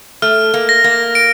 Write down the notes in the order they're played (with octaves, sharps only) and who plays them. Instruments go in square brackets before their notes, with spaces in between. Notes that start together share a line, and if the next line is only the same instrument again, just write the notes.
[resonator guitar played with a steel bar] A3 [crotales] F6
[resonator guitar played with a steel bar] A#3
[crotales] A#6
[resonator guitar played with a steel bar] A#3
[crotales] D7